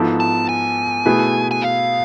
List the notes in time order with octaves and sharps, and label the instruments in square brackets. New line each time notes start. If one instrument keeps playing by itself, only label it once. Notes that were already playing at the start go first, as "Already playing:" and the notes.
Already playing: [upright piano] G#2 F3 B3 E4 A4
[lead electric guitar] A5
G#5
[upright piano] B2 A3 E4 G#4 B4
[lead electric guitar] G#5
F5